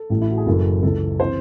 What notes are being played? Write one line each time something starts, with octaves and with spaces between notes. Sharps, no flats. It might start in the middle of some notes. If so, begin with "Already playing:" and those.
Already playing: A4
A1 A2 E3
E4
F#4
G#4
F#1 F#2 E3 A4
C#2 C#3 E3 A4
C3 E3 C5